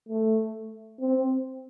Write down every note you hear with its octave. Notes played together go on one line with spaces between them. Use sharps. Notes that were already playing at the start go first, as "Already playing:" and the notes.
A3
C4